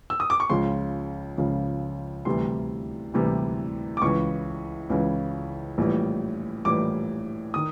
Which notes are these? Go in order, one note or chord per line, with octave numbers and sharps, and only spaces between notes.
E6
D#6
D6
C#6
C#2 C#3 F3 C6
C#2 C#3 F3
D2 C3 E3 G3 C6
D2 C3 E3 G3
D6
C#2 C#3 E3 C#6
C#2 C#3 E3
A#1 A2 E3 G3
A#1 A2 E3 G3 D6
D#3 D#6